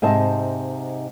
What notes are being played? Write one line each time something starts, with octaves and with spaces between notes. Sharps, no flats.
G#2 C3 D#4 E5 A5